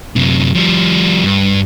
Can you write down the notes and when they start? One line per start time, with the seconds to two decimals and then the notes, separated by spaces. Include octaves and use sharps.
0.16 F#2 C3
0.55 F3 G3
1.24 G2